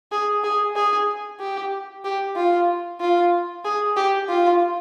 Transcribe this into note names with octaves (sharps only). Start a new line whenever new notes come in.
G#4
G#4
G#4
G4
G4
F4
F4
G#4
G4
F4